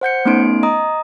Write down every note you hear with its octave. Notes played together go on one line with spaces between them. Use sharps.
C5 F#5 G6 C#7
A3 B3 C#4 D#4 C6 D7
D#5 A#5 D#6